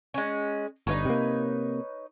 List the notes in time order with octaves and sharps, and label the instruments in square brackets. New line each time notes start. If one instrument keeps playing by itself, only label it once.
[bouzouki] G#3 C#4
[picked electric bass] G1 [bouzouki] D#4 B4 C#5
[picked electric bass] C3 A#3